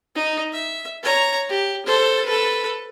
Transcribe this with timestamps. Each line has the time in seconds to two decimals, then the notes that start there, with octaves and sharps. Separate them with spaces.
0.15 D#4
0.52 E5
1.02 C#5 A#5
1.49 G4
1.86 A4 C5
2.25 A4 B4